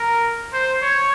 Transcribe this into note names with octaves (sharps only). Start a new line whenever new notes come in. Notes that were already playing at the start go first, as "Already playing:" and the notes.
Already playing: A#4
C5
C#5